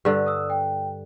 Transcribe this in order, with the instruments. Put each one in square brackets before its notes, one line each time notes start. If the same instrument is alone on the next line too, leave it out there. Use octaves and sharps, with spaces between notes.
[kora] G2 D3
[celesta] D#6 E6
G5